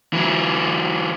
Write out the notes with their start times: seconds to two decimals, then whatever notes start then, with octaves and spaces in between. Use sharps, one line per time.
0.13 E3 F#3